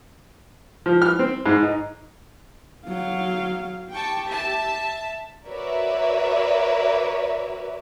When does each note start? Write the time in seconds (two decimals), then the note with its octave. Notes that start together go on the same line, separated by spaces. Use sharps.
0.86 F3
1.02 F6
1.19 C4
1.46 G#2
1.63 D#4
2.88 F#3 F5
3.91 G4 G5 A5 C#6
4.26 E5 A5
5.47 F#4 A#4 B4 C#5 D5 E5